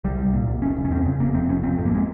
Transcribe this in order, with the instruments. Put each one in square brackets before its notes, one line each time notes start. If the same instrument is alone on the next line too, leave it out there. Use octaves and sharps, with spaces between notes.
[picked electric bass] C2 G3
C2
A#2
C2
F1 C#4
F1
C#4
E2 C4
C#3
F1 A#3
F2 C4
F1 C#4
F2 C4
G#1 C4
A#3
G#3